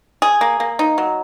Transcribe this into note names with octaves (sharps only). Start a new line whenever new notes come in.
G#4
A#3
A#3
D#4
F#3